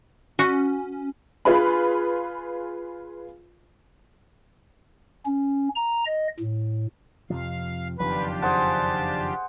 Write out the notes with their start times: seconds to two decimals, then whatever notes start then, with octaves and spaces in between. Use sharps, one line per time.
0.39 C#4 F#4
1.45 F4 G#4 B4 B5
5.26 C#4
5.75 A#5
6.06 D#5
6.40 A2
7.30 F2 C3 F3 F5
7.99 F#1 F2 D#3 D4 F4 G4 B4
8.42 G#4 C5 F#5 A5